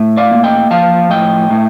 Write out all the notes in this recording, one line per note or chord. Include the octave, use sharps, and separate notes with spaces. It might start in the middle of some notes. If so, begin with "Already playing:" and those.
Already playing: A2
D5 F5
A#3
D#5 G5
F3 F5 A5
A2 D#5 G5
A2